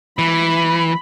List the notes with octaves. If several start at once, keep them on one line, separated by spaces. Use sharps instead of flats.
E3 B5